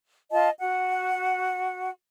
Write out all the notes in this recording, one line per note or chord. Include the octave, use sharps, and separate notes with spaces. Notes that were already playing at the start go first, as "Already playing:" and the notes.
F4 D#5 A5
F#4 F#5